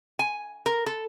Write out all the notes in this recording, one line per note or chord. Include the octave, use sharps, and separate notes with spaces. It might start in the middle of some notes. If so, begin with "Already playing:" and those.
G#5
A#4
A4